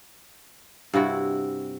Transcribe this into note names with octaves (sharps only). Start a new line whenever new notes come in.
G2 C3 E4 F#4